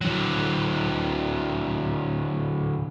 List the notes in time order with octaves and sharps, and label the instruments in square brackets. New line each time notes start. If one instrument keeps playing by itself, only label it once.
[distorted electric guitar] D3 F#3